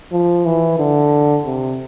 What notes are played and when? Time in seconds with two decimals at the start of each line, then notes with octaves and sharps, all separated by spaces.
0.12 F3
0.46 E3
0.79 D3
1.46 C3